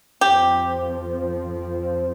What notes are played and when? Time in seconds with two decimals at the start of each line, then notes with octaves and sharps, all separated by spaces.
0.21 F2 F3 C4 G4